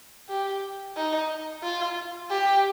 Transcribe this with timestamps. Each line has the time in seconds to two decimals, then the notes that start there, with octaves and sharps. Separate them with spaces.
0.29 G4
0.96 D#4
1.64 F4
2.31 G4